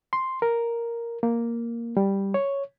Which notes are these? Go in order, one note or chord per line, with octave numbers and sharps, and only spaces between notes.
C6
A#4
A#3
G3
C#5